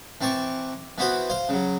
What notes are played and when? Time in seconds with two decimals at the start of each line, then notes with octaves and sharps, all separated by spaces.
0.21 E3 C4 A5 C#6 D6
0.98 E3 B3 E4 F#4 C5 B5
1.30 C5 F5 C6
1.49 C#3 F#3